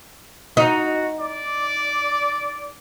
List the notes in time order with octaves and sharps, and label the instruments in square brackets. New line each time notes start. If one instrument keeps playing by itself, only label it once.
[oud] D#4 [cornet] F#4
[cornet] D5